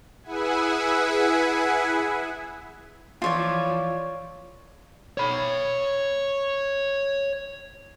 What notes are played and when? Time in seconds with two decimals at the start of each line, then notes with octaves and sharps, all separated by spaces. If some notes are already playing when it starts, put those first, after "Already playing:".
0.23 E4 G#4 B4 E5 F#5 G#5
3.22 E3 F3 F4 C#5 D5
5.18 C#5 B5